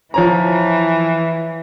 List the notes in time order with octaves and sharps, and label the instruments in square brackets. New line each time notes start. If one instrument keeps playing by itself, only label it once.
[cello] E3 [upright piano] F3 C#5 A#5